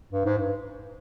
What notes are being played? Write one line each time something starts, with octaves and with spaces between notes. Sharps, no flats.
G2
G#2
G2